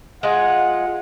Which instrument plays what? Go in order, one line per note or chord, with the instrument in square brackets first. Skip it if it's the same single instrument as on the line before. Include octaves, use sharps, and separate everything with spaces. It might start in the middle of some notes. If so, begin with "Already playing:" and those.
[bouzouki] G#3 F4 [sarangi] F#5